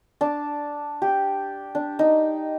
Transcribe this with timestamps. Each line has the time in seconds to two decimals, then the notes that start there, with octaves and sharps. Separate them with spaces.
0.21 D4
1.02 G4
1.75 D4
1.99 D#4